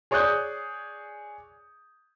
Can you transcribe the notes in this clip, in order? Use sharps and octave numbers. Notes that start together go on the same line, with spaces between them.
G#4 C#5 D5 D#6 F#6 G6